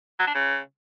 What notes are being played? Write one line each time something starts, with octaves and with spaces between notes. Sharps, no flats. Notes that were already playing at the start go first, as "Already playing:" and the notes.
F#3
D4
C#3